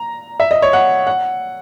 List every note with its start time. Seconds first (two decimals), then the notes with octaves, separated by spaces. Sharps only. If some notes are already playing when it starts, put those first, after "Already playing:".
Already playing: A#5
0.40 E5
0.51 D#5
0.62 C#5
0.73 F#5
1.07 F#5